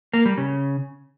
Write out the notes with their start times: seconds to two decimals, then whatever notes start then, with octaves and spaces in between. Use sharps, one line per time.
0.13 A#3
0.25 G3
0.37 C#3